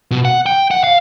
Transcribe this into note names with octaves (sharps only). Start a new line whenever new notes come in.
B2
F#5
G5
F#5
F5